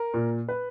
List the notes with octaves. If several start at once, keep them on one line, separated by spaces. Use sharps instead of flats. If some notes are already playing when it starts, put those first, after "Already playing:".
Already playing: A#4
A#2
B4